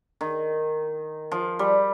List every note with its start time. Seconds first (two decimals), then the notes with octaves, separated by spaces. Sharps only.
0.21 D#3
1.32 F3
1.59 G3